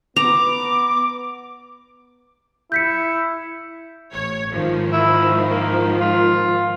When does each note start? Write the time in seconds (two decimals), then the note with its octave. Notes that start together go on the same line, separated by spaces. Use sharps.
0.16 B3 A#5 D6
2.72 E4 G6 B6 C#7
4.13 A1 C#5
4.50 G#2 D#3 F3
4.92 E4
5.51 A#3
6.01 F4